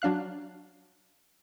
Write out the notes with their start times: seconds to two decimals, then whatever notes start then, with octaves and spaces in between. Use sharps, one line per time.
0.02 F#3 D4 F5 F#6